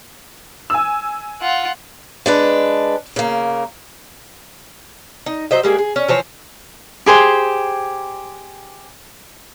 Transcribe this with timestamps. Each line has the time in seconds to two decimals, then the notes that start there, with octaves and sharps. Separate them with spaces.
0.70 G#5 E6
1.41 F4 F#5
2.26 G#3 D4 B4
3.16 C#3 A#3
5.26 D#4
5.51 F#3 C5 D#5 E5
5.63 G3 G#3 A#3 G#4
5.79 G#4
5.96 C#4
6.08 E3 F3 C5 C#5
7.06 G4 G#4 C5 G5